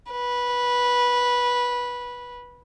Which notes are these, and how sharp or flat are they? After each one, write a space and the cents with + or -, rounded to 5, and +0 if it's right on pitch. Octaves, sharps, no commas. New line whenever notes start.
B4 -15